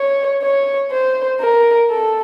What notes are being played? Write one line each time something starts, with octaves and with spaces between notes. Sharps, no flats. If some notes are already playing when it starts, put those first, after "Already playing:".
Already playing: C#5
C#5
C5
A#4
A4